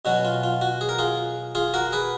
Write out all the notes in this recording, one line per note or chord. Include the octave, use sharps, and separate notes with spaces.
B2 F#3 C#4 F#4
F4
F4
F#4
G#4
A#4
F4 G#4
F4 G#4
F#4 A#4
G#4 B4